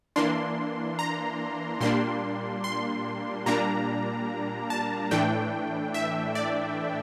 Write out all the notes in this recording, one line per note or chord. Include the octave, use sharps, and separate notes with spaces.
E3 A#3 D4 C6
A#5
A#2 G3 A#3 D4 C6
C6
A#2 G3 A#3 D4 A#5
A5
A2 E3 A3 D4 G5
E5
D5